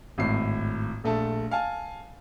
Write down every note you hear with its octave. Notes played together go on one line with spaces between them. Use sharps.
G#1 A2 C7
A#1 A3 A5
F5 G#5 A5